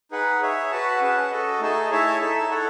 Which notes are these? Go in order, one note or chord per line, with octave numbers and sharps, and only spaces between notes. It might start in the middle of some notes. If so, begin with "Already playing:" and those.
D#4 G#4 B4 F#5
G#4 C#5 E5
F#4 B4 F#5 A5
C#4 G#4 B4 F#5 A5
F#4 A4 D#5
A3 D#4 G#4 D#5 A5
E4 G#4 C#5 E5 A5
D#4 A4 E5 A5
E4 A4 C#5 F#5